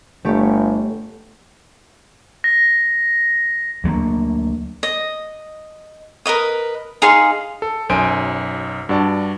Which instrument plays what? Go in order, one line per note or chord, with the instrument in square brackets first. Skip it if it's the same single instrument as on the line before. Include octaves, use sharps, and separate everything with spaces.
[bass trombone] G1 [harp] A3 G4 C#5
[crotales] A#6
[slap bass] D2 F#3 A3 A#3
[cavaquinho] D#5
A#4 B4 D#5 D#6
D#4 G#4 F5 C6
[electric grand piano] A4
B1 F#2 C5 G#5 D7
G2 F#4 D5 A5